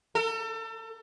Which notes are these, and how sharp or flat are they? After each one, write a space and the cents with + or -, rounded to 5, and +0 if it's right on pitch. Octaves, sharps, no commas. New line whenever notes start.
A4 +35